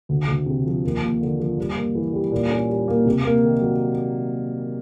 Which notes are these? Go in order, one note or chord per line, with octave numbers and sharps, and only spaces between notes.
D2
D2
C3
F3
D#2
A#3
D3
F3
G2
A#3
E3
G3
A#2
C#4
G3
A#3
C3
A#3
D#3
F#3